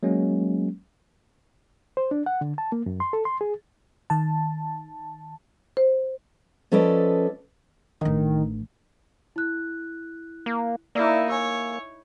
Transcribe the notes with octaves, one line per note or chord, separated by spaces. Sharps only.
F#3 G#3 A#3 C#4
C5
D4
F#5
D3
A5
A#3
F#2
C6
A4
C6
G#4
D#3 A5
C5
F3 C#4 A4 B4 D5 D#5
A1 D#3 D4
E4 F#6
A#3
A#3 D#4 E4 D5 E6
C#5 G#5 E6